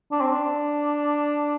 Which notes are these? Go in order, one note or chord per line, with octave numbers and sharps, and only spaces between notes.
D4
C4
D4